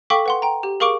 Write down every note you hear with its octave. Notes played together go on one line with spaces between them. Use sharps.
A4 F5 G5 C#6 D6 B6
B4 F#5 C6
G5 A#5
G4
G#4 A#4 F5 C#6 D6 D7